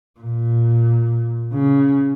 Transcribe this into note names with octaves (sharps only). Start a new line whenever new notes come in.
A#2
C#3